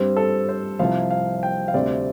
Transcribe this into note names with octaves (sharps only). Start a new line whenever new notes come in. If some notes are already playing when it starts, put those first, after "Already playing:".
Already playing: G2 G3 C4 C5
A4
C5
C2 C3 F3 F5
F5
G5
F5
D2 C3 G3 C4 D5